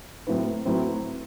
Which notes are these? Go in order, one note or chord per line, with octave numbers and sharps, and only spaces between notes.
A2 F#3 C4 E4 B4
A2 F#3 C4 E4 B4